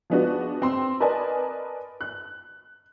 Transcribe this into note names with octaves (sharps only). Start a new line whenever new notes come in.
F3 G#3 B3 D4 F#4
C4 C6
A#4 B4 D5 D#5 G#5 A5
F#6